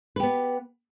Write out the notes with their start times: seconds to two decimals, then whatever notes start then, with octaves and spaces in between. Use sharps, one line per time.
0.16 B4
0.20 G4
0.23 B3